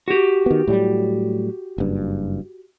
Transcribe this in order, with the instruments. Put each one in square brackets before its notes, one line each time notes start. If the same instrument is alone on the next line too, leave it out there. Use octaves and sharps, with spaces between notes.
[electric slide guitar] F#4 G4
[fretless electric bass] D#3 B3
A2 F#3 G3
F#1 G2